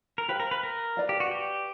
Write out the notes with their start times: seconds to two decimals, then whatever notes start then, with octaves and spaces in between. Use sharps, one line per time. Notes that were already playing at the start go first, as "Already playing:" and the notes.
0.18 A#4
0.28 G4 B4 C5 F5
0.40 A#4
0.51 B4
0.63 A#4
0.97 B4 D5 F5
1.09 G4
1.20 F#4
1.31 G4